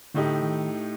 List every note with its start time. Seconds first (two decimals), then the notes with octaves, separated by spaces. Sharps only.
0.14 A2 D3 A3 D#4 G4
0.43 D#3